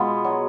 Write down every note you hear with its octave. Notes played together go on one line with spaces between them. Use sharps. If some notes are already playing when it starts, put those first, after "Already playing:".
Already playing: B2 G#3 B3 F4
F#3